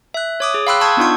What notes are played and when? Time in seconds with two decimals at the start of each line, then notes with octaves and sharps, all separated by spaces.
0.14 E5 F#6
0.40 C#5 D6 D#6
0.54 G#4
0.67 F5 G5 B5 C6 E6 F#6
0.81 A5 C#6 D#6 E6 G6 G#6
0.97 B3 D4 D#4 F4 C6 C#6